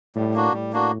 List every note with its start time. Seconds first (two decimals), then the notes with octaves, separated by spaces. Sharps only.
0.15 A2 G3
0.34 A#3 D4 F#4
0.53 A2 G3
0.73 A#3 D4 F#4